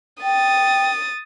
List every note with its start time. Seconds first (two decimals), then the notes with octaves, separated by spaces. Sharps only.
0.23 G5 D#6 A6